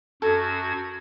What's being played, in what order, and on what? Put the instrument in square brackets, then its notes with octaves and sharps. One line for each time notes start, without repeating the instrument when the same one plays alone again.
[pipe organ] F#2 F#4 G#6 [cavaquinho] A4